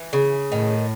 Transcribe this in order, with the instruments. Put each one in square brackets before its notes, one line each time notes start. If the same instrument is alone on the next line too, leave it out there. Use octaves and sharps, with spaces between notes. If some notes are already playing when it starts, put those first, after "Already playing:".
Already playing: [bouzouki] E3
C#3
[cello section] A2 [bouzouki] D#3